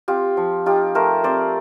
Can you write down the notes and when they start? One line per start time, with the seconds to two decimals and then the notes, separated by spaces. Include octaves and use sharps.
0.08 C4 F4 G4
0.37 F3
0.66 D#4 F4 G4
0.95 A3 A#4 C5
1.24 C4 C5 D5